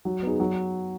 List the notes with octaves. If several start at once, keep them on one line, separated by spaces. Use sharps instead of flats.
F#3
B3 D#4 G#4
F#3